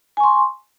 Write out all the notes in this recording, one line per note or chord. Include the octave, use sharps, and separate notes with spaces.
G#5 C6 C#6